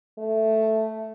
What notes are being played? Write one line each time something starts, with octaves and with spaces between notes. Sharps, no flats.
A3